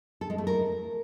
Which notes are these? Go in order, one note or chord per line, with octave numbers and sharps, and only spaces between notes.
A4
G#3
A3
A#4